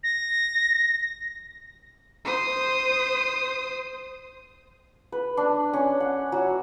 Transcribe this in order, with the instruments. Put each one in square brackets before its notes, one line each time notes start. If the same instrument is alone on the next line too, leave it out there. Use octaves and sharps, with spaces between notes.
[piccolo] A#6
[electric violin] C5 D#6
[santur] B4
D4
C#4
F#5
F#3